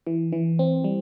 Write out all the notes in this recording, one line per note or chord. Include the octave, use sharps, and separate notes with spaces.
E3
E3
C4
G3